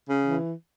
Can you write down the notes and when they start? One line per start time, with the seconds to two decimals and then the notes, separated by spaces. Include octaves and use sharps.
0.10 C#3
0.25 E3